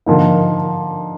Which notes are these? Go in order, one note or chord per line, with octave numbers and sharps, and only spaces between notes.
D3 F3 A#3 D#4